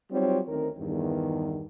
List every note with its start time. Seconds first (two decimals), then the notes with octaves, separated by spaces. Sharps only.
0.12 F#3 G3 C4 D#4 F4 C#5
0.48 D2 D#3 C4 A#4
0.78 E2 G2 D#3